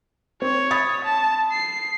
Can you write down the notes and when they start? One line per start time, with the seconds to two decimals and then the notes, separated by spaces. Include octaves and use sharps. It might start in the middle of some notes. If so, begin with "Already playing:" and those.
0.42 C4 C#5
0.71 B5 D#6 A6
1.05 A5
1.52 C7